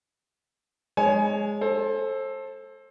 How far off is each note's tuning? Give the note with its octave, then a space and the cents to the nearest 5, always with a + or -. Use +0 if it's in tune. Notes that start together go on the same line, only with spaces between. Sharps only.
G#3 +0 C#5 +0 G#5 +35
A4 +0 C5 +30